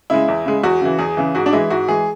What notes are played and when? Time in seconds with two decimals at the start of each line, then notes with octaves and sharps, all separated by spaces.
0.10 C#3 G#3 E4
0.28 E2
0.46 C#3 G#3
0.63 E2 F#4
0.81 C#3 E3
0.98 E2 G#4
1.17 C#3 E3
1.35 G#2 F#4
1.46 D4
1.53 E3 G#3 E4
1.70 G#2 F#4
1.88 E3 G#3 G#4